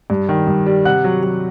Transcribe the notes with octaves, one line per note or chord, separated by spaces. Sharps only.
G2
D#3
G2
G3
C3 F#5 F#6
F#3
F#3